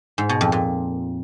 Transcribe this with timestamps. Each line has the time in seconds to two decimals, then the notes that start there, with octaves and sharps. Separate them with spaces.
0.18 G#2
0.29 B2
0.41 F2
0.52 A#2